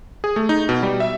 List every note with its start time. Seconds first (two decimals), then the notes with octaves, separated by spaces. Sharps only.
0.24 G#4
0.36 A3
0.49 D#4
0.69 B2
0.83 G3
1.00 E5